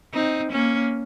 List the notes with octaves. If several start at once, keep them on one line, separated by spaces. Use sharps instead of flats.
C4 D#4
A#3 C#4